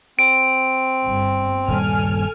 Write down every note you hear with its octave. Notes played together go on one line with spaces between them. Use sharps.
C4 D7
G1
D#1 G2 G3 A4 G#5 F6